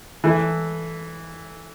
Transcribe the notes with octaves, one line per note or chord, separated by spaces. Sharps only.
E3 A3 E4